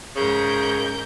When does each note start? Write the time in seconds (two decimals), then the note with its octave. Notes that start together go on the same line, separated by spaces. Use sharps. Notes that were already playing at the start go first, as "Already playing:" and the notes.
0.16 G#2 C#3 A#4 G6